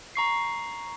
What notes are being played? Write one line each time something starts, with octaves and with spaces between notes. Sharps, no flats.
A#5 C#6 C7